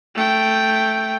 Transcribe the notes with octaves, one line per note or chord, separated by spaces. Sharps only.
A3 G5